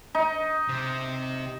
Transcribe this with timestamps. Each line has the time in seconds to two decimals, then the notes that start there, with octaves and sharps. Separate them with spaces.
0.15 D#4
0.69 C3